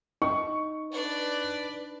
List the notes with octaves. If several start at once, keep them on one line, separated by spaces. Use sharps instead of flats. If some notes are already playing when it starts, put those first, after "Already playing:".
D#4 C#6
D4 B4 D5